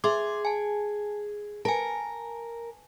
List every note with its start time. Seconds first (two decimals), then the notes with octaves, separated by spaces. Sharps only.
0.04 G#4 E5 C6 D6
0.45 G#5 A5
1.65 A#4 G#5 A5